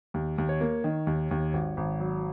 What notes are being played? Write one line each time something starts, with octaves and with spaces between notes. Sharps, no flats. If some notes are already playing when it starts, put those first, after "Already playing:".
D#2
D#2
C#5
A#3
D#3
D#2
D#2
G#1
G#1
F#3